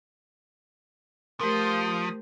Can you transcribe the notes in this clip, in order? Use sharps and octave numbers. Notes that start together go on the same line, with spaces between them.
F3 A3 G4 A#4 C5 D#6